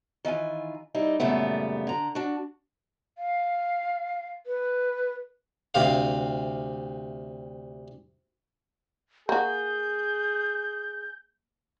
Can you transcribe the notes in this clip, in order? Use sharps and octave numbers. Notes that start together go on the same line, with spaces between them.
D#3 E3 F4 G#5
G3 D#4 E4
F#2 A#2 C#3 G3 A3 B3
D3 A#5
D4 F#4
F5
B4
D2 C3 C5 F5
A#3 F#4 G#4 G6